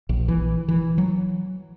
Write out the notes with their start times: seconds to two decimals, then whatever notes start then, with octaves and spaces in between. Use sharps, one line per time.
0.09 A#1
0.28 E3
0.68 E3
0.98 F#3